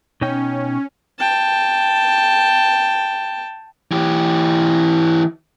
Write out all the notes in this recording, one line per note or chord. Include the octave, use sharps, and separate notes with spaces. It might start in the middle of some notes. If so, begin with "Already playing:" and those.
B2 C#4 D#4 G5
G5 A5
E3 G4